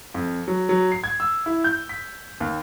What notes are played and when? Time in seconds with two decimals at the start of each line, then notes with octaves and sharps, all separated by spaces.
0.14 F2
0.48 F#3
0.69 F#3
0.92 C7
1.04 G#6
1.20 E6
1.46 E4
1.64 G6
1.89 B6
2.40 D#2